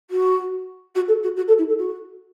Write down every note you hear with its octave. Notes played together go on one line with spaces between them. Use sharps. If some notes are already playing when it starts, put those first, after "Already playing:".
F#4
F#4
A4
F#4
F#4
A4
E4
A4
F#4